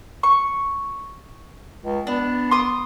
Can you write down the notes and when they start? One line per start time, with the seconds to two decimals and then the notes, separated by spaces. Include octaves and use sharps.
0.23 C#6
1.83 C#2
2.07 B3 D4
2.51 C6 D6 D#6